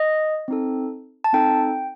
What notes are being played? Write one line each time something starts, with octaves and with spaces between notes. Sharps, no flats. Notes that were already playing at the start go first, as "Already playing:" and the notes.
Already playing: D#5
C4 D#4 A4
A5
C4 D#4 A4 G5